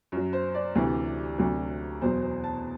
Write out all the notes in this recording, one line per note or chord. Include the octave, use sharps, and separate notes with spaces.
F#2 F#3
C5
D5
D2 C3 E3
D2 C3 F#3
E2 B2 F#3 C5
C5
A5